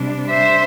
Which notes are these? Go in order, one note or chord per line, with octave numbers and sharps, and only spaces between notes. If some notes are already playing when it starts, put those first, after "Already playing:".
Already playing: C3 G3 D4
C5 E5